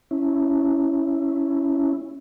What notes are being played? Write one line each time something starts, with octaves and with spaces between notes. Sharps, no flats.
C#4 E4